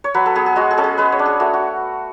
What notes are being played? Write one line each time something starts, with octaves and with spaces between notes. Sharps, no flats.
C#5
F#3 B4
A4
B3 G#4
G#4
G#3 F#4
G#4
C#4 A4
G#4
G#3 B4
C#5
D4
G#4
A3 F#4
F#4